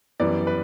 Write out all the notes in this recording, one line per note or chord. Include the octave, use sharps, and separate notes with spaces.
F#2 E3 G3 B3 D5
B4